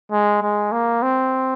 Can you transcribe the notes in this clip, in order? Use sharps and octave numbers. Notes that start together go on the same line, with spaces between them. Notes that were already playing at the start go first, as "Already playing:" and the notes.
G#3
G#3
A#3
C4